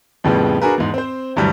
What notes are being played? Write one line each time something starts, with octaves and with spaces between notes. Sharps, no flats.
F2 A2 C#3 G3 B3
D4 F#4 G#4 A#4 B4
E2 G#2
C4 C5
D2 G2 E3 F#3 G3